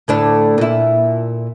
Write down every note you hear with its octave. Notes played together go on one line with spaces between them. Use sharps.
D2 A2 D4
A#2 E4